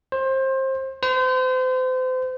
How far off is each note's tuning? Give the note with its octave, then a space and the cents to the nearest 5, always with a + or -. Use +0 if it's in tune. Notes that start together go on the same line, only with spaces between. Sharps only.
C5 +25
C5 -35